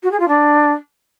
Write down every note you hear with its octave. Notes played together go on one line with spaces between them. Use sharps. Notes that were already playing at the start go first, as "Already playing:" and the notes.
F#4
G#4
F4
D4